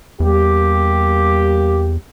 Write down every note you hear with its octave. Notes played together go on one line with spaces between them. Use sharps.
E2 G3 A#3 G4